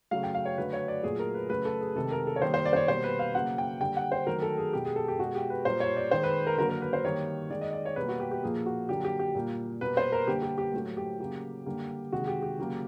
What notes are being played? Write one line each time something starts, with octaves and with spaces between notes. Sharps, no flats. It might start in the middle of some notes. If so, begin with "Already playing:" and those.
C#3 F#3 A3 F5
G5
F5
C#5
D3 F#3 A3 B4
C#5
D5
A#2 F#3 A3 G#4
A#4
B4
C#3 F#3 A3 B4
A4
G#4
C3 D#3 G#3 A4
A#4
A4
C#5
D#3 G3 A#3 C5
C5
D5
C5
C#5
B2 G3 A#3 C5
B4
F5
C#3 F#3 A#3 F#5
G5
D3 G3 A#3 G5
F#5
C5
D#3 F#3 A3 A#4
A4
G#4
B2 G#3 G4
G#4
A4
G4
B2 G#3 F#4
G4
B4
A#2 G3 A#3 C5
C#5
D5
D#3 G#3 C5
B4
A#4
D3 F#3 A#3 A#4
A#4
B4
C5
D#3 G3 A#3 C#5
D#3 G#3 D5
D#5
D5
C#5
B2 G3 A#3 B4
F#4
G4
G4
A#2 F3 A#3 G#4
F#4
D3 F#3 A#3 G4
G4
G4
A#2 G3 A#3
B2 G3 A#3 B4
C5
A#4
D3 G3 A#3 G4
G4
G4
A2 F#3 A3
G4
C#3 F#3 A#3
D3 G3 A#3
C3 D#3 G#3 F#4
G4
G4
C#3 F#3 A#3